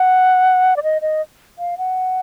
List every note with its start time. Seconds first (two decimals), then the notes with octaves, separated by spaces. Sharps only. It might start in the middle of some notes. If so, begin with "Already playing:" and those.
Already playing: F#5
0.76 D5
0.83 D#5
1.02 D#5
1.59 F5
1.78 F#5